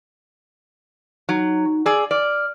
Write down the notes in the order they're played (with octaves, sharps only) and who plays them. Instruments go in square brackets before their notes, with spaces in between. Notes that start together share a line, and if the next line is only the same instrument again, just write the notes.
[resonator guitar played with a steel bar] F#3 [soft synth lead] D#4
[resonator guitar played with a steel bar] G#4 D5 [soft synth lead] E6
[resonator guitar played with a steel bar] D5 [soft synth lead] F6